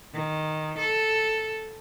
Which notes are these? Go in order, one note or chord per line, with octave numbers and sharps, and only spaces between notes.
D#3
A4